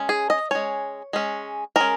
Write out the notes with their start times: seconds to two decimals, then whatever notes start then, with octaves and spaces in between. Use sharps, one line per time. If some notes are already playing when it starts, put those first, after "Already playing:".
Already playing: G#3 C#4
0.09 G#4
0.30 D#5
0.51 G#3 C#4 C#5
1.13 G#3 C#4
1.76 G#3 C#4 A#4